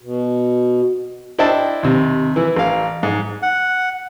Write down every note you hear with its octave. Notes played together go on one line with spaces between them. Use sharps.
B2
D4 E4 C5 D#5 G5 A5
D#2 C3
E3 E4
A1 F5
G#2
F#5